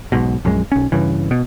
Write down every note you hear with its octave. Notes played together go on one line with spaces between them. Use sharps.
B1 G#2 B2
A#1 F#2 G#3
B1 C#4
G2 C#3 E3
B2